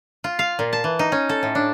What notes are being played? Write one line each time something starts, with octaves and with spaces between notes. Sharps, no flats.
F4
F5
A#2
A5
E3
D#4
C#4
A4
A2
D4